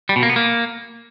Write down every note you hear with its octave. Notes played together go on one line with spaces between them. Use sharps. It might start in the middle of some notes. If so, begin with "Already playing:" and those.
G3
B2
A#3
B3
A#3